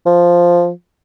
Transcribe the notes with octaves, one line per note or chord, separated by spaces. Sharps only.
F3